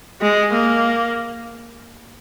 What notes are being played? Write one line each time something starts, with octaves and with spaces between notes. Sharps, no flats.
G#3
A#3